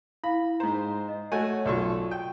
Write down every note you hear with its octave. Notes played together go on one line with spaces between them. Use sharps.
E4 F5 B5
G#2 C5 A#5
D#5
A3 F#4 C#5 G#5
B1 F4 F#4 A4 D5 C#6
G5